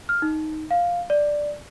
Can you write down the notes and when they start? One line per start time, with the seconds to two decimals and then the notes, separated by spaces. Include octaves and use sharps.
0.09 F6
0.22 D#4
0.71 F5
1.10 D5